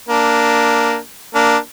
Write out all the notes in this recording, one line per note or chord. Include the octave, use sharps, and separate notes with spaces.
A#3 D4
A#3 D4